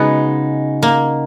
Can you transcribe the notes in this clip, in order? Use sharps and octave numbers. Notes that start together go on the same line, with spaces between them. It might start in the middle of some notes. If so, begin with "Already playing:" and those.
Already playing: C#3 G#3 B3 D#4 F#4
A#3